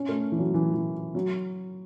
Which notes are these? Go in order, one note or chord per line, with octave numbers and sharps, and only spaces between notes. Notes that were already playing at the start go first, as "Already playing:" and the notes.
Already playing: C#4
A3
E3
F#3
E3
E3
F#3